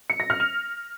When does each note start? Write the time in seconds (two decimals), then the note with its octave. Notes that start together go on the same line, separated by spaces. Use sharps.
0.10 C#7
0.20 A#6
0.30 F6
0.40 F7